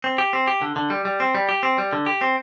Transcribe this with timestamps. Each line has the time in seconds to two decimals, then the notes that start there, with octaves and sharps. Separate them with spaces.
0.04 C4
0.18 G4
0.33 C4
0.48 G4
0.62 D3
0.76 D3
0.90 G3
1.05 G3
1.20 C4
1.35 G3
1.49 G4
1.63 C4
1.78 G3
1.93 D3
2.06 G4
2.21 C4